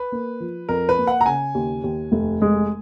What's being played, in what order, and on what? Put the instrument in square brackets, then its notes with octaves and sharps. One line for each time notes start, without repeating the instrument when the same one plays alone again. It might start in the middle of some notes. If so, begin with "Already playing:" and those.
Already playing: [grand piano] B4
[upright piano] A#3
F3
[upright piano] F2 [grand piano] A#4
[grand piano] B4
[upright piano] A#3
[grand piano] F#5
A#5
[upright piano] C#3 [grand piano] G#5
[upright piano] D#2
D#2
F1
G#3